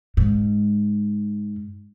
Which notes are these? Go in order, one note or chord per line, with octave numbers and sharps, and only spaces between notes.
G#2